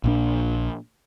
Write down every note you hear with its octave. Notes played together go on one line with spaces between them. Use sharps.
A#1 A#2 D4